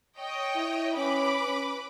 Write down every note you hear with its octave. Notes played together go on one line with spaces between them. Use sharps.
C#5 D#5 G5
E4
C#4 B4 B5 D6
C#4